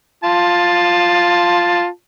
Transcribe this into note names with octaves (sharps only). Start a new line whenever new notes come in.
F4 A5